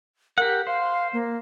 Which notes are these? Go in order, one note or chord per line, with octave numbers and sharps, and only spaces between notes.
G4 A#4 F#5
C5 F5
A#3